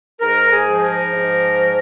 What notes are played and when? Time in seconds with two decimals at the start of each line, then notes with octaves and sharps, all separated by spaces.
0.19 G#2 A#4
0.51 G#4
0.66 F3
0.82 A#4
1.13 G#2
1.60 F3